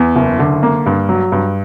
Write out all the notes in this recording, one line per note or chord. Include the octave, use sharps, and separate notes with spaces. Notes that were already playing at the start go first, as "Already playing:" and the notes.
Already playing: E2
F#1
D3
A#3
G2
F#3
G2